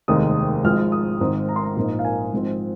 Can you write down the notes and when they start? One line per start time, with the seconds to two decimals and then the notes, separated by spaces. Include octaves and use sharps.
0.08 F1 D#2 D#3 G#3 C4 D#6
0.64 G#1 G#2 F3 G#3 F6
0.92 D#6
1.20 G#1 G#2 D#3 C4
1.49 A#5
1.56 C6
1.64 A#5
1.77 A#1 G#2 F3 A#3 D#4
1.99 F5
2.05 G#5
2.33 G#1 G#2 F3 C4